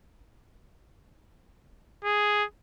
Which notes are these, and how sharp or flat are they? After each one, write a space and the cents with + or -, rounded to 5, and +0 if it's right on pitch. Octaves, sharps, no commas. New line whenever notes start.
G#4 +0